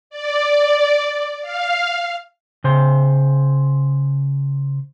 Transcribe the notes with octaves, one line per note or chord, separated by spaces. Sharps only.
D5
F5
C#3 C5